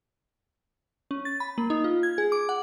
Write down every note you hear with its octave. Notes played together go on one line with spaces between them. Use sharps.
C#4
A6
B5
A#3
D#4
F4
G#6
G#4
D6
F#5